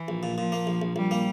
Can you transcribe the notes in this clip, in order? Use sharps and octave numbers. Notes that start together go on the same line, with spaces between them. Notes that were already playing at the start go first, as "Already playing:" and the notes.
Already playing: E3
A#1
A#2
A#2 F3
A#3
A#1
A#1
A#1 G3
A#3